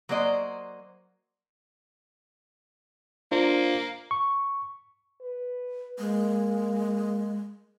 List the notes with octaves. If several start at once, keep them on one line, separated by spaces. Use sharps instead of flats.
F#3 A#3 C5 D5 D#5
A#3 D4 F4 C5
C#6
B4
G#3 A#3